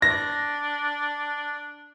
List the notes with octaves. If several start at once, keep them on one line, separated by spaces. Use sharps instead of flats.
D4 A#6